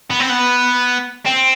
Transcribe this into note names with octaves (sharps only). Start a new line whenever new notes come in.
B3
C4
B3
C4